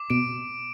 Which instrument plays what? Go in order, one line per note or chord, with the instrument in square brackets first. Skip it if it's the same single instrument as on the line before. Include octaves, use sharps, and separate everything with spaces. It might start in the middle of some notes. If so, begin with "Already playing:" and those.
Already playing: [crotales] D6
[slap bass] B2 [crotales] D7